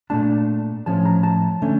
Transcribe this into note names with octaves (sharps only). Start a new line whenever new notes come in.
A#2 A3 D4 A5
A2 F3 C#4 A5
A#5
A5
D3 A3 C#4